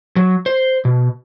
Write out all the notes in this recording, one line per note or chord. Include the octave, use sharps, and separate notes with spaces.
F#3
C5
B2